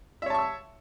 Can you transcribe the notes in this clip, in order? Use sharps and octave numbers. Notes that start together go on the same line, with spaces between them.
C#5 E5 A5 C#6 E6